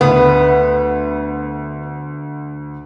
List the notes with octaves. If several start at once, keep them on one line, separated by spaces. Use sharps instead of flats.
D2 B3